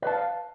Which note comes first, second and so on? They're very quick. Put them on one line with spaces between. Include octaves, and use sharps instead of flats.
B4 A5 F5